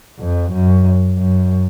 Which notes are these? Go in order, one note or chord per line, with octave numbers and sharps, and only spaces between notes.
F2
F#2
F#2